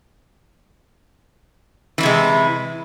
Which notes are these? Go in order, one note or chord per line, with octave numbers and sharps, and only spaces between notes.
C3 E3 G#3 E4